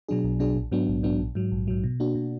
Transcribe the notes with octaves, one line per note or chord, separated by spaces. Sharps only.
B2 F#3 D4 G#4
B1
B2 F#3 D4 G#4
A#1
G#2 F#3 B3 D4
A#1
G#2 F#3 B3 D4
A#1
G#2 F#3
A#1
G#2 F#3
B2
A#3 D4 F#4
B2